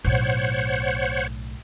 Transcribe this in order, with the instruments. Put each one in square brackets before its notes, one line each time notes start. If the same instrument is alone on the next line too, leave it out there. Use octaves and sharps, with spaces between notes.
[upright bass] B1 A2 [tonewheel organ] C5 C#5 F#5